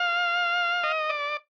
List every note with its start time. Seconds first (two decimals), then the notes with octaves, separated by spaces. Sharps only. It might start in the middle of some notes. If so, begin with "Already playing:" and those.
Already playing: F5
0.84 D#5
1.09 D5